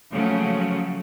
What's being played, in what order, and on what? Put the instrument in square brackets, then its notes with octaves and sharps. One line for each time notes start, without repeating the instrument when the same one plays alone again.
[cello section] C#3 F3 F#3 A3 A#3 C#4